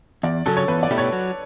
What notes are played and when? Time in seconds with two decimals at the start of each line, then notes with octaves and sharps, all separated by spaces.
0.23 E2 D5
0.46 C#3 F#3 C#4 A4
0.57 C#5
0.68 E2 B4
0.83 D5
0.91 B2 A3 E4 G4
0.98 C#5
1.12 F#3